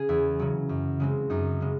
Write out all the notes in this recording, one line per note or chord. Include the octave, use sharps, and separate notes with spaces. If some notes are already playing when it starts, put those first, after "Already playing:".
Already playing: C#3 G#4
E2 E4
C#3 F#3
F#2
C#3 G#3 C4
F#2 D#4
C#3 G#3